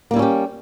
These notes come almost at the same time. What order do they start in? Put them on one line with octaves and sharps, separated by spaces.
A#3 G3 E4 C#4 G4